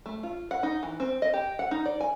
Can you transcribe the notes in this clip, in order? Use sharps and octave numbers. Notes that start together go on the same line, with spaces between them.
A3
F4
F#5
D#4
E3
C4
D#5
G4
F#5
D#4
D5
G#5